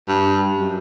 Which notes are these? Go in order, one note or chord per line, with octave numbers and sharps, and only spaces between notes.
G2
F#2